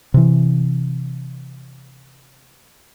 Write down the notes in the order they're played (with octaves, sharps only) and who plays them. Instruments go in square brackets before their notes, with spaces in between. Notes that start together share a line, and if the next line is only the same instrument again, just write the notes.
[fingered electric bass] C3 E3